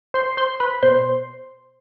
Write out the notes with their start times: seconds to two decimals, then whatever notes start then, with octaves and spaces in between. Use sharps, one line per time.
0.14 C5 C6
0.37 C5 C6
0.60 B4 B5
0.83 B2 C5 C6